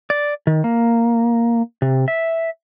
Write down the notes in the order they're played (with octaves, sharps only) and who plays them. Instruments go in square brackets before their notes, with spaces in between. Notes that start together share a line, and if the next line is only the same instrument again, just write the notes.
[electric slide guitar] D5
D#3
A#3
C3
E5